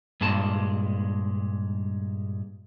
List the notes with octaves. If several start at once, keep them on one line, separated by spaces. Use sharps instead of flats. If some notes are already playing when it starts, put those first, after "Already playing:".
G2 A#2 G#3 A5